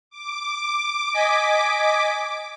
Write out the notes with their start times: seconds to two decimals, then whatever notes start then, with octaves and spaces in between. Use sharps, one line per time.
0.10 D6
1.14 D#5 G#5 B6